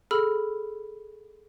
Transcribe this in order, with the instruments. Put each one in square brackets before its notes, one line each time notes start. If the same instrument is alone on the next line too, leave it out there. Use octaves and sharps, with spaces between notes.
[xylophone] G#4 A4 B5 E6 F6